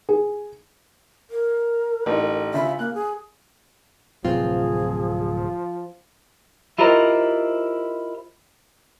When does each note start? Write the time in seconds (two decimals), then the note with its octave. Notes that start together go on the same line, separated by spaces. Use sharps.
0.09 G#4
1.30 A#4
2.06 A1 D#4
2.54 C#3 F4 E5 B5
2.79 A#3 F#6
2.94 G#4
4.25 D1 C3 F3 F#3 C4 F4 G#4
6.79 E4 F4 G4 A#4 C5 D#5